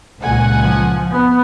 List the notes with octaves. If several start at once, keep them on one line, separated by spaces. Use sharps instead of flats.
C#2 A#2 F#5 G#5
F3
B3